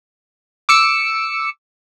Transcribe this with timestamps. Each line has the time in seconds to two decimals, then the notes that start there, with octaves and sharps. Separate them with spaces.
0.69 D6 E6 C#7